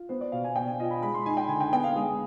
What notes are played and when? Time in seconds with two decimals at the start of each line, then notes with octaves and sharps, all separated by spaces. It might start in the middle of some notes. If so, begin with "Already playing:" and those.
Already playing: F4
0.09 B3 C5
0.21 D5
0.32 B2 F5
0.44 G#5
0.56 B2 G5
0.67 G#5
0.79 F4 D#5
0.91 B5
1.02 G#3 B5
1.14 C6
1.26 D#4 G#5
1.37 G5
1.48 D3 G#5
1.60 G5
1.72 B3 G5
1.84 F5
1.96 G#3 G#4